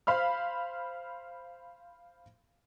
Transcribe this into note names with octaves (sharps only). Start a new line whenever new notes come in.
C5 F5 B5 F6